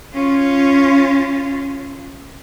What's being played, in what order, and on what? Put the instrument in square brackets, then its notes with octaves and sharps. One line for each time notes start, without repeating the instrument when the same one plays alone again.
[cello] C#4 F4